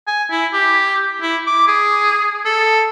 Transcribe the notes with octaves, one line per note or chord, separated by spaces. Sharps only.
G#5
E4
G4
E4
D6
G#4
A4